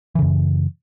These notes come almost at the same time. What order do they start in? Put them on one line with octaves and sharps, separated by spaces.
E3 C#3 F#2